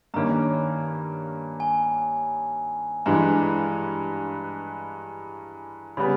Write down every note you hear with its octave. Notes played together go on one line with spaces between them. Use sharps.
G2 D#3 A#3 C#4 A#5
G#5
G2 E3 G#3 A#5
C#3 G3 B3 B5